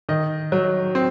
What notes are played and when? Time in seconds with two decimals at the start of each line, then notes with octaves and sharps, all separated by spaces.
0.09 D#3 D#5
0.52 F#3
0.95 C4